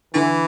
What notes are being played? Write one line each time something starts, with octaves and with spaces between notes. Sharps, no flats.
D3 E3